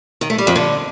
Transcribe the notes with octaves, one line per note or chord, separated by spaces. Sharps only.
D#3
A3
G3
F2
D3